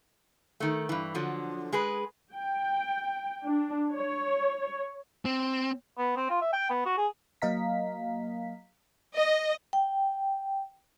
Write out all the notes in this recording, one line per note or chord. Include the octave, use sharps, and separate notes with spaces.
D#3 A3
G2 E3
D3 F3 F#3
G#3 G#4 B4
G5
D4
C#5
C4
B3
C4
F4
E5
G5
B3
F#4
G#4
F#3 A#3 D#5 F5 A#5 B6
D#5
G5